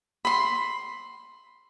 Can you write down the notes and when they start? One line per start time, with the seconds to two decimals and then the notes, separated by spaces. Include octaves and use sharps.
0.25 B5 C6